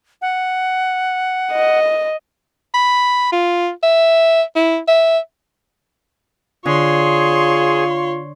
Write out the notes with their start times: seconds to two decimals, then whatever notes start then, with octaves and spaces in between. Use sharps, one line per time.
0.22 F#5
1.52 D#5
2.74 B5
3.32 F4
3.83 E5
4.56 E4
4.88 E5
6.65 D3 F4 G#4 C#5 C6